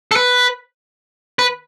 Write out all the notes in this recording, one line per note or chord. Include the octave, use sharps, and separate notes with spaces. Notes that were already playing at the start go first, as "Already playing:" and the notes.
A4
B4
B4